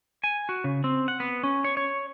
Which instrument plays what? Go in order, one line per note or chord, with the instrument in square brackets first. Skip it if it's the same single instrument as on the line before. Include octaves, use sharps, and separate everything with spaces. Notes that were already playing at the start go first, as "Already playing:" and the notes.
[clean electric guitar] G#5
F#4
C#3
C4
F#5
B3
C#4
C#5
C#5